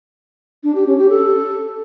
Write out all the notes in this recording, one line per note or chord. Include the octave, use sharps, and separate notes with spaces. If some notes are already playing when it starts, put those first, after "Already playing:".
D4
G4
C#4
G4
A4